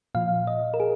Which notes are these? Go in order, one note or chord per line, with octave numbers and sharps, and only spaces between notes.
A#2 F3 F5
D#5
A#4
G#4